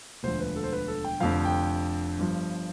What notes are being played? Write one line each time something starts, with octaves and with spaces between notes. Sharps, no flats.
E1 D2 D3 F3 C5
B4
A4
C5
B4
A4
G5
F1 F2 D3 F3 F5
G5
G1 G2 F3